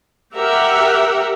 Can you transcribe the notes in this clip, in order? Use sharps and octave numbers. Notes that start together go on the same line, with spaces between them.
G4 A#4 E5 F#5